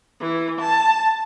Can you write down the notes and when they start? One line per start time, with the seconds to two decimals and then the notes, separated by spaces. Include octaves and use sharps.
0.20 E3
0.60 A5